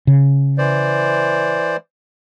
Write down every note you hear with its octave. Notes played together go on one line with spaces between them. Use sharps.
C#3
E3 C5 D5